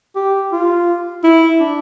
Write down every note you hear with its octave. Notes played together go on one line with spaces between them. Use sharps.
G4
F4
E4
D4